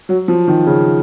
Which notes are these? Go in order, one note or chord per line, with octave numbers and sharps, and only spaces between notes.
F#3
F3
D#3
C#3